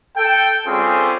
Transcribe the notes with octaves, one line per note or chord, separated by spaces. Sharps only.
A4 G5
G3 C4 C#4 F4 G#4 A4